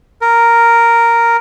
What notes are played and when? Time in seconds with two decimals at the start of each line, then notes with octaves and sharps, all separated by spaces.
0.22 A#4